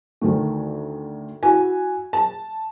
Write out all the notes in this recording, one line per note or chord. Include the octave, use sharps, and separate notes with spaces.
D2 D#3 A3
E4 F#4 G#5
A5